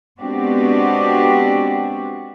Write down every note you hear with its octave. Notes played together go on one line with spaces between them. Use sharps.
G#3 B3 C4 D4 F#4 G4